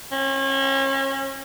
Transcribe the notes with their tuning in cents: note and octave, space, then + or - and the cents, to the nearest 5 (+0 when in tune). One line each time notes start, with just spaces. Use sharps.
C#4 -35